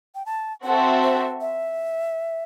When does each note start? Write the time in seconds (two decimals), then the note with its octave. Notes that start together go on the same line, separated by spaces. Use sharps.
0.15 G5
0.26 A5
0.63 C4 F#4 A4 E5 F#5
1.03 C5
1.41 E5